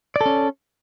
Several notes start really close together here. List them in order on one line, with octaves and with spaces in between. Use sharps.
D5 A4 C#4